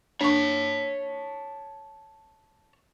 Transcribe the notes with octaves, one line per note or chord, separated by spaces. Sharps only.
D4 C#5 A5 C#6